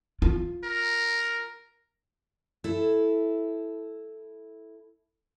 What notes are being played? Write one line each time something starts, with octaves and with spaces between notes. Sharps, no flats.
F4
A#4
E4 A4